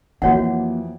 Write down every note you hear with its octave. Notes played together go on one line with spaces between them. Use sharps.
F2 E3 A#3 F#4 C#5 F#5